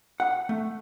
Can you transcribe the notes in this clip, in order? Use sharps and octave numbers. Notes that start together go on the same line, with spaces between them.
F#5
A3